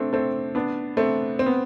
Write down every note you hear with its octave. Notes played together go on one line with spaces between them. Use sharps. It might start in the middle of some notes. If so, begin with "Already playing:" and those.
Already playing: A3 C4 D4
A3 C4
B3 D4
A3 C4
C4
B3